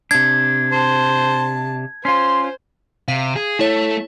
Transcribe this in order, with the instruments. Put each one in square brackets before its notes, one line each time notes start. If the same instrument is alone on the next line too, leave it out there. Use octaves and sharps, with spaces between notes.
[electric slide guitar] C3 D4 [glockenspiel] G#6
[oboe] C5 [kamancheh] A5
[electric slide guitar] C#4 F4 [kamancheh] C5 [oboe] C6
[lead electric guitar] C3 [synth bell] F5
[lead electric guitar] G#4
[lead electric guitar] A3 [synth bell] E4 C#5